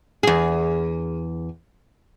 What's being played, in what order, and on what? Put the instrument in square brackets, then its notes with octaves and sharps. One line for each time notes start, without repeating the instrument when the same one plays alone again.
[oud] E2 G#4